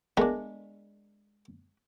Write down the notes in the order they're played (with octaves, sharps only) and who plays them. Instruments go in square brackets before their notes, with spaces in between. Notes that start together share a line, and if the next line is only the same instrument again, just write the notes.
[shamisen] G#3 D4 [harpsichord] A3 B3 A#4